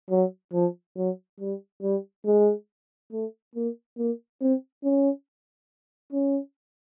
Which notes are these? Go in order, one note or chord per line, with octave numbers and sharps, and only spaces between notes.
F#3
F3
F#3
G3
G3
G#3
A3
A#3
A#3
C4
C#4
C#4